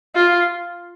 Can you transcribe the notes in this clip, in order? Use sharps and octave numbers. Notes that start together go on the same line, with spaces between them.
F4